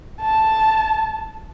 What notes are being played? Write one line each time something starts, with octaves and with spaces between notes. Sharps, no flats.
A5